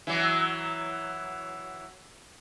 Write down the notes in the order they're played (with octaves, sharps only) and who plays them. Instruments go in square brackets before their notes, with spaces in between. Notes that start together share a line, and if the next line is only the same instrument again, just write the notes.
[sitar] E3 F#3